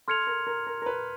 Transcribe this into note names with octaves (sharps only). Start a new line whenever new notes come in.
A4 C6 F6 G#6 C#7 F7
A#4
A#4
A#4
A#4
B4